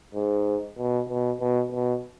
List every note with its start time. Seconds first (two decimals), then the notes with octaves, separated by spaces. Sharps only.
0.15 G#2
0.77 B2
1.09 B2
1.41 B2
1.72 B2